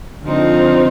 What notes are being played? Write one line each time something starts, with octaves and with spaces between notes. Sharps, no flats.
D3 F3 C4 D#4